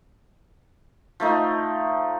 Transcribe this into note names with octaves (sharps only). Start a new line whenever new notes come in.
F3 A3 D#4